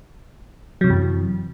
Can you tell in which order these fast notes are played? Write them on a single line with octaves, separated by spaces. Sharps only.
F#3 C3 E3 F#2